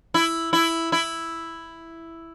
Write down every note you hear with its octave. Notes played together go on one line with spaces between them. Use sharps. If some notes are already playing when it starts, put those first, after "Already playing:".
E4
E4
E4